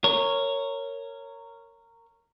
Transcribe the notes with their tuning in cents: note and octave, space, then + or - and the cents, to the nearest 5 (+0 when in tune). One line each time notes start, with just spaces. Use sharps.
A#4 -15 C#5 +0